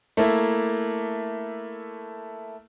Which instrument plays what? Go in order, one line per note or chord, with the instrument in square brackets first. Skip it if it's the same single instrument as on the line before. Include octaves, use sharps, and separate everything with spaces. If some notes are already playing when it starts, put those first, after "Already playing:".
[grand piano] A3 A#3 E4